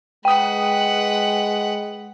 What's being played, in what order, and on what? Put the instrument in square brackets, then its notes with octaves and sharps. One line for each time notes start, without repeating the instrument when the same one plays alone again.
[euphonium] G#3 [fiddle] B4 F#5 [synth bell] G5 D#6